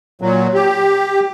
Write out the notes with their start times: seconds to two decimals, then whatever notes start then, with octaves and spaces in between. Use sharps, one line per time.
0.21 A#2 F#3
0.54 G4